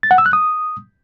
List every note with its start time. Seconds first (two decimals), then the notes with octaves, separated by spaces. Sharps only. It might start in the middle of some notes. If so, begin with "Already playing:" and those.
0.03 A6
0.11 F#5
0.18 E6
0.26 F#6
0.33 D#6